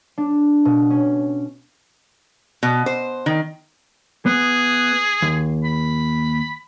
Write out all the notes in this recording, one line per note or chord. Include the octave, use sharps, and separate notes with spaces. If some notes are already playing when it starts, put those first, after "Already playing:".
D4
B2
C#4
B2
C5
D#3
B3 G#4
D#2
B5